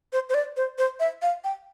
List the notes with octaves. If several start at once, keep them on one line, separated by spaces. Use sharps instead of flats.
C5
C5
D5
C5
C5
E5
F5
G5